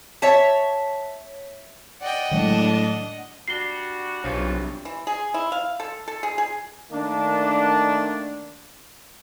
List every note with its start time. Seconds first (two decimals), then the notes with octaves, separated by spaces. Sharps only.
0.22 C#5 E5 A5
2.01 D5 D#5 F#5 G5
2.31 A2 D#3 F#3 G#3 D4
3.48 G3 D4 F#4 C7 G7
4.24 B1 E3 F3 D4 G4 C#5
4.85 E3
5.07 G#4
5.34 E4
5.52 F5
5.80 A4
6.08 A4
6.23 G#4
6.38 G#4
6.91 D#3 A3 A#3 D4